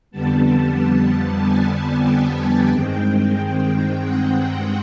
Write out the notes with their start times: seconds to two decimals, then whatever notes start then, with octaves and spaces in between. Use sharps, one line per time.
0.11 F2 D3 G3 B3 A5
1.41 G#5
2.05 G5
2.70 G2 D#3 G#3 C4
4.00 F#5